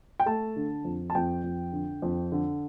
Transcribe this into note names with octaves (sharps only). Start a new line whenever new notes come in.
G5
A3 A5
D3
F2
A5
F2 G5
F2
D3
F2
D3